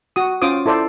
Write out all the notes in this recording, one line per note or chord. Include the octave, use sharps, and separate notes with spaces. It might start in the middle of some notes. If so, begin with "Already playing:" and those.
F#4 D#6
C#4 F4 C5 D6 D#6
E4 A4 C5 D5